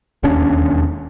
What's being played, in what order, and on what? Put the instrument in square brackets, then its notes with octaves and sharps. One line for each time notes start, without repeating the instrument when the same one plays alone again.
[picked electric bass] E1 D#2 C#4 D4